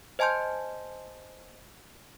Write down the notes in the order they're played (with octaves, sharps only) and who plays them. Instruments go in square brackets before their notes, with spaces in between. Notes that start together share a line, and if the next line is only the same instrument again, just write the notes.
[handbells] C5 D#5 G#5 A5 C6 G6